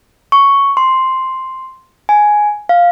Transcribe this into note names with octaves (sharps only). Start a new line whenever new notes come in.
C#6
C6
G#5
F5